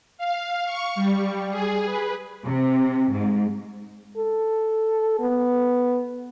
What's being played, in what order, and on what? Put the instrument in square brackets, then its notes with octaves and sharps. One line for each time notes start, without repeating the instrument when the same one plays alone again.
[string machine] F5
C#6
G3
G#4
B4
[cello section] C3
G#2
[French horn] A4
B3